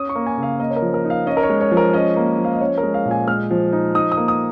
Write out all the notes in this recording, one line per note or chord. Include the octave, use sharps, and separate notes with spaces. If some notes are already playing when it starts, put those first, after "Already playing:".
Already playing: C#4 D#6
C#6
A#3
G#5
C#3
F5
A#3 D#5
C#5
A#4
F3
A#4
D#4
F5
C#4 D#5
A#4
C#5
G#3
C#5
F3
A#4
C#4 D#5
A#3
F3
F5
D#5
C#4 C#5
A#4
G#3
F5
A#2
G#5
G#3 F6
F3
D#4
D#4 D#6
D#6
A#3
D#6